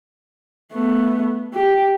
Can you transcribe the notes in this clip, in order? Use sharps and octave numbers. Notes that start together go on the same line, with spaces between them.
A3 B3
G4